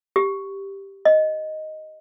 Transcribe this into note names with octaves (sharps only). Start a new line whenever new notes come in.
G4
D#5